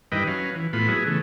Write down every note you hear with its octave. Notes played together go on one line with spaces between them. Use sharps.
G2 D#3 E4 B4 D#5 G5
F#3 C#4 B4 F5
E3
A2 B3 F4 B5
F#3 B3 E4 G#4
C#3 E3 A3